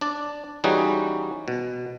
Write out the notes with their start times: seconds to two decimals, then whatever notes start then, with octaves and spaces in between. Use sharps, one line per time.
0.01 D4 D5
0.64 E3 G3 C#4 D#4 F#4 G#4
1.48 B2